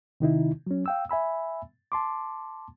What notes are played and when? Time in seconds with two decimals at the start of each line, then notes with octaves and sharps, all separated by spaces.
0.20 C3 D#3 D#4 E4
0.67 F#3 C#4
0.86 F5 G5 E6
1.09 E5 G#5 B5 E6
1.92 A5 C6 D6